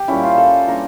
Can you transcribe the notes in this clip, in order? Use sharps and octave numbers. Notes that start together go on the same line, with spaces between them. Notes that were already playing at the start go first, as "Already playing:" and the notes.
Already playing: G4
A#2 G3 C#4 E4
F4
A4
E3 G3 A#3 D4 A#4